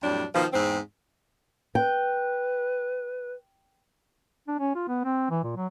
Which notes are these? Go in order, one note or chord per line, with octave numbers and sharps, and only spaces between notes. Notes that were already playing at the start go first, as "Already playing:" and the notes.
F2 A2 F#3 G3 D4
B2 D#3 F3
E2 G#2 C4
B4 G5
D4
C#4
F4
B3
C4
E3
A#2
F#3